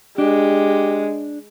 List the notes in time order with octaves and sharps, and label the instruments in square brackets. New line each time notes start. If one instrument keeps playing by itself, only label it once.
[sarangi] G#3 [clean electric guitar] D4 [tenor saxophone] G4